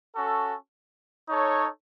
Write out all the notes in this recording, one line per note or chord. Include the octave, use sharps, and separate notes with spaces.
C#4 F#4 A4
D#4 A4 C#5